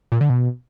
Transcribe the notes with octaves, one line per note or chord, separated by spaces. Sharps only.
A#2
D3
B2